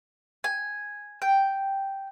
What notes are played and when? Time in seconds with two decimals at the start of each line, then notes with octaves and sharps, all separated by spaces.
0.44 G#5
1.22 G5